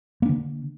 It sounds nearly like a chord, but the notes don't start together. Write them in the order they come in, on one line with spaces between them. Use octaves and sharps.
A#3 D4 D3